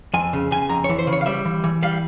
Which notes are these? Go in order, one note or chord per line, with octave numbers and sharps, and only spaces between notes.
F2 G#5
C#3
C#3 G#5
F2 A#5
C#5
E3
C5
C#3
C#5
F5
G3 E5
E3
E3
G3 F5